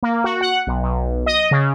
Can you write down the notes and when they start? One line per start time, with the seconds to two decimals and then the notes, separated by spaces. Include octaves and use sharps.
0.03 A#3
0.24 F#4
0.41 F#5
0.67 B1
0.83 B1
1.26 D#5
1.51 C#3